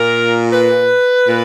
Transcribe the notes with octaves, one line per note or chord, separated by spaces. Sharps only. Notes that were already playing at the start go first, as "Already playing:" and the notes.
Already playing: A#2 A#4
B4
A#2